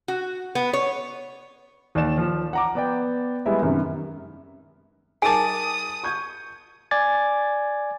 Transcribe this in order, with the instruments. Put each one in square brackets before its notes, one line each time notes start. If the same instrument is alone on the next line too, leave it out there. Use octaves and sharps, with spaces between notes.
[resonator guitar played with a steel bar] F#4
B3
C#5
[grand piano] D#2 D5 E7
F3
F#5 A#5 D6
B3 D5 G5
G3 G#3 B3 E4 E5
F#2 C3 D#3
[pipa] D#4 A5 [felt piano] G#4 A#4 [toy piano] G#5 D6 [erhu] D#6
[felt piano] C#6 G6 G#6
[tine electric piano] D5 G#5 D6 G#6 A6